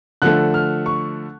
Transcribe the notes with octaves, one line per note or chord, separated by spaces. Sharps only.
D3 F3 A3 F#6
F6
C#6